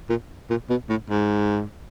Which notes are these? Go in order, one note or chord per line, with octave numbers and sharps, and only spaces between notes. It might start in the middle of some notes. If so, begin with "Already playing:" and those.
A#2
A#2
B2
A2
G#2